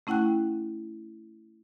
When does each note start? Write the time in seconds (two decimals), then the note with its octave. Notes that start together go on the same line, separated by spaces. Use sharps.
0.07 A3 C#4 E4 F#5 G5 F#6